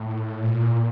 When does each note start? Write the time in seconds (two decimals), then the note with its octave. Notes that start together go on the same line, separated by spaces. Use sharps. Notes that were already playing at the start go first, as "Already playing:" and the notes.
Already playing: A2
0.43 A#2